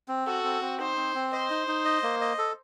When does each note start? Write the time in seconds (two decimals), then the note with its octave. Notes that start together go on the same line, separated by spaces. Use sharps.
0.08 C4
0.27 F#4 A4
0.44 C4
0.61 C4
0.79 D#4 C5
0.97 C4
1.15 C4
1.32 C5 D#5
1.50 D#4
1.68 D#4
1.85 D#5
2.03 A#3
2.21 D#5
2.38 A4